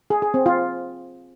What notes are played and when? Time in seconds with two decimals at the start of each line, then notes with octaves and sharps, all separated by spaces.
0.10 G#4
0.22 G#4
0.34 C4
0.46 F4